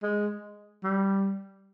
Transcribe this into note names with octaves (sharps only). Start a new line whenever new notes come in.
G#3
G3